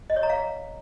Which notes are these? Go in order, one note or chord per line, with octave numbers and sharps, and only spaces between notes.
D#5
C#5
A#5
F5